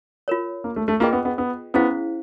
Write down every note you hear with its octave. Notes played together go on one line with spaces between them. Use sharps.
F4 A#4 C#5
A#3
A3
A3
A#3 F4 G#4 B4 D#5 G5
B3
B3
B3
B3 C#4 E4 G#4 C5 F5